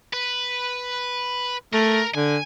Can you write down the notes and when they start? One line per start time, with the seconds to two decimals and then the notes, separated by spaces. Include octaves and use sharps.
0.13 B4
1.73 A3 A#4
2.15 D3 G#5